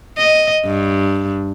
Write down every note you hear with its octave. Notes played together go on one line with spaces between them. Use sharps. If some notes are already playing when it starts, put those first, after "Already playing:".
D#5
G2